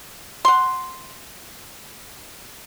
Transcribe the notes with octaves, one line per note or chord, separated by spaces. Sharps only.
F#5 C6